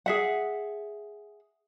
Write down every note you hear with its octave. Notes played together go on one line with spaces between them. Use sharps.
G#4 E5 F#5